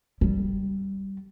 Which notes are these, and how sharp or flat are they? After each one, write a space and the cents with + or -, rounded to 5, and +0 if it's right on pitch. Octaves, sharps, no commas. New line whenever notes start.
G3 -15